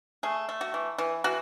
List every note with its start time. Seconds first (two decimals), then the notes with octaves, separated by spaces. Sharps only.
0.23 A3 G#4
0.49 A3
0.61 F#4
0.74 E3
0.98 E3
1.24 E3 F#4